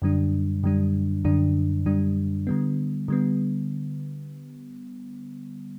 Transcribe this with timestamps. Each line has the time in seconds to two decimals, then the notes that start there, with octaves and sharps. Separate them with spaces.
0.02 F#2 D3 G3 D4
0.63 F#2 D3 G3 D4
1.25 F#2 D3 G3 D4
1.86 F#2 D3 G3 D4
2.47 D3 G3 B3
3.08 D3 G3 B3